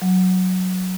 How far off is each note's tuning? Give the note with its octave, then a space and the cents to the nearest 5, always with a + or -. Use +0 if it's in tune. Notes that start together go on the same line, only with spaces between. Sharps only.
F#3 -5